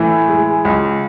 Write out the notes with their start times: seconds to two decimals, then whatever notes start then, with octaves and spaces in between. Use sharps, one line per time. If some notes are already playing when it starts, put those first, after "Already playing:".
Already playing: A2 E3
0.29 G#3
0.65 C#2